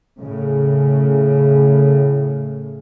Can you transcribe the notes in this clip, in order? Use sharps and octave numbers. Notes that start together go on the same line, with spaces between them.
A2 C#3